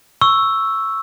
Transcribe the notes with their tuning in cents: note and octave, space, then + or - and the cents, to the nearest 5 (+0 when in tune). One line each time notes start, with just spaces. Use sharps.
C#6 +0 E6 +0